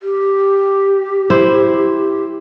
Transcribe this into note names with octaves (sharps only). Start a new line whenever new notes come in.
G4
E4 C5